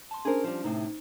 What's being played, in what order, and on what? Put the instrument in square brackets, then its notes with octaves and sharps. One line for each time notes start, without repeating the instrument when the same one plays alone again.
[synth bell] A5 C6
[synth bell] C#4 D4 C5 [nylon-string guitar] G#4 A#4
[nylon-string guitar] F3 G3
[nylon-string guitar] A2 C3 [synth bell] D#4